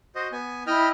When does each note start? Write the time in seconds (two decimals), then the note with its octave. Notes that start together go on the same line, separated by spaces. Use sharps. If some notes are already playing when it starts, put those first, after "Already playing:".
0.15 F#4 C5 D#5
0.32 B3 G#5
0.67 E4 D#5 G5 F6